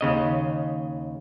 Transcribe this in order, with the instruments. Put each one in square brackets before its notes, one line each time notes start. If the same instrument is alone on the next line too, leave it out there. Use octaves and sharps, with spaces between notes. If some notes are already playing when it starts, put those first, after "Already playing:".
[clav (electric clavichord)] D#2 C#3 D#5